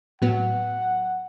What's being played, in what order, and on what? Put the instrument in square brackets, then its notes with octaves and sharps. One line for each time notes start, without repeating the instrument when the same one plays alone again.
[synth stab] A2 F#3 B3 [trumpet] F#5